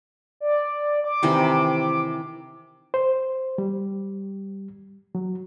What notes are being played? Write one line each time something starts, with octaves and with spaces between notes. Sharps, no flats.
D5
D6
C3 D#3 E3
C5
G3
F#3